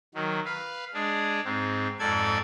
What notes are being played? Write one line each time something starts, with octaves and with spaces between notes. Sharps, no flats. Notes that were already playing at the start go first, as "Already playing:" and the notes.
D#3 F#3
B4 F5
G#3 D4 G#4
G#2 C4
F2 G#2 A4 D5 G#6